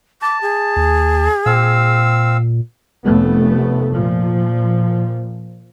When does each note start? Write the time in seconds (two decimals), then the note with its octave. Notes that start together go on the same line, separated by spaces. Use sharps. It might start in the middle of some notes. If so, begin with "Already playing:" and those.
0.22 A5 D6
0.42 G#4
0.76 D#2
1.46 A#2 C4 F5 E6
3.04 F1 A3 B3
3.91 A#2 F3